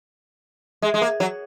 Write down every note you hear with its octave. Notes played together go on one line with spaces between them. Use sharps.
G#3
G#3
A#3
F#3